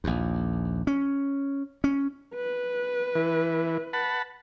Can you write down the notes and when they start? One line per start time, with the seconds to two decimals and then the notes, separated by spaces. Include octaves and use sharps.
0.04 A#1 D#2
0.87 C#4
1.84 C#4
2.35 B4
3.15 E3
3.93 F#5 A5 B5